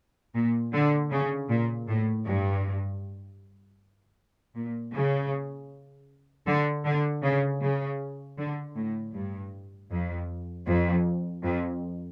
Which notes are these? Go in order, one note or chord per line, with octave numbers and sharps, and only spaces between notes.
A#2
D3
C#3
A#2
A2
G2
A#2
C#3
D3
D3
C#3
C#3
D3
A2
G2
F2
F2
F2